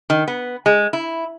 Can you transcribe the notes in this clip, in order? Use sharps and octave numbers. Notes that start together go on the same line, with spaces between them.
D#3
B3
G#3
E4